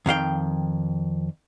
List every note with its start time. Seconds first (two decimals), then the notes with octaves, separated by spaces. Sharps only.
0.06 F2 D#3 F5 G5